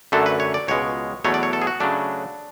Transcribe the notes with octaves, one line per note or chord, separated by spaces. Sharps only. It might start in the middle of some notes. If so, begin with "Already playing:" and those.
F#2 D3 F#3 A3 A4
B4
C#5
D5
C#2 B2 G#3 C#5
E2 B2 F#3 A3 C#5
D5
C#5
A4
G#4
F#4
C#3 F#3 A3 D4